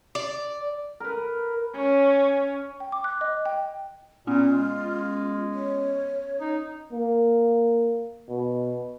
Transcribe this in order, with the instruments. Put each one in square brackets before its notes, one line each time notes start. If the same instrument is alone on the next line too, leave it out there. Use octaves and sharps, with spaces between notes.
[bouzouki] D5
[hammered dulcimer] A#4 B4
[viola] C#4
[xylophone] G5
D6
F#6
D#5
G5
[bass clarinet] A#2 [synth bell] B3 C#4 [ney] F4
[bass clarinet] G#3
[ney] C#5
[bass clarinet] D#4
[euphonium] A#3
B2